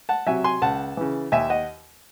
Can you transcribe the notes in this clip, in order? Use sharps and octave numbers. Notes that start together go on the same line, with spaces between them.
F#5 A5
C3 F#3 E5 G#5
G#5 C6
C#2 F#5 A5
C#3 E3
D#2 E5 G#5
D#5 F#5